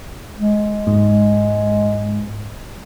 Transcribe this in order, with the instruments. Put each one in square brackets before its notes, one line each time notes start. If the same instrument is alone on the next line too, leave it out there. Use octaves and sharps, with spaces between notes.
[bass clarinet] G#3
[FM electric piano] G#2